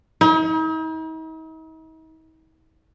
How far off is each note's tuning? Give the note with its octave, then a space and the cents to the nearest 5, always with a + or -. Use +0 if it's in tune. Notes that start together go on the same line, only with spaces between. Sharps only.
D#4 +45